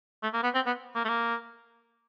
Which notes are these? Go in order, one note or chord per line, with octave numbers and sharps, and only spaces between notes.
A3
A#3
B3
C4
B3
A#3
A3
A#3